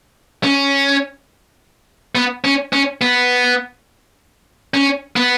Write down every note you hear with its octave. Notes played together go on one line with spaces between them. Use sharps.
C#4
B3
C#4
C#4
B3
C#4
B3